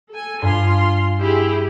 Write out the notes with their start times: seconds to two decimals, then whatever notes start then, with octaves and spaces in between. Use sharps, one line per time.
0.11 A4 G#5
0.42 G2 F4 G#5 C6 B6
1.20 E4 G4 G#4